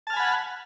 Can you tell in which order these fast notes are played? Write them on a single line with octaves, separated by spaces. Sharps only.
A5 F6 G#5 B5 F#5